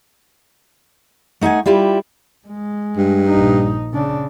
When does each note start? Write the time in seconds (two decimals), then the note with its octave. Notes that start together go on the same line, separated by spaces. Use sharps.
1.41 A3 D#4 E5 F#5 G#5
1.66 G3 E4 F4 G4
2.48 G#3
2.97 G2
3.29 A#1 D#4
3.94 C#3 D4